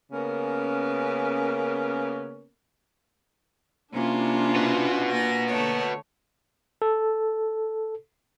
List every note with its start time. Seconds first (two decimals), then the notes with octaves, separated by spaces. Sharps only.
0.12 C#3 A#3 B3 C#4 A#4
3.94 C3 A#3 C#4 D4 E4 F4
4.56 B3 F#4
5.10 A#3 G#5 A#6
5.49 D3 A3 C#5
6.82 A4